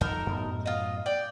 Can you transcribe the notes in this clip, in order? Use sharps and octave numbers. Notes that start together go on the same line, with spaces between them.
F2 D#4 A4 A#4
F#2 A2 B3
F4 D#5
D5 G5